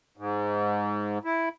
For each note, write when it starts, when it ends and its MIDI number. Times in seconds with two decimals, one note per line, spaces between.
0.17 1.18 44
1.25 1.49 64